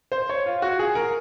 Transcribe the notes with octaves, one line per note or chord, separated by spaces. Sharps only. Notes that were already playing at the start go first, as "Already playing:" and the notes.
C5
C#5
F4
F#4
G#4
A#4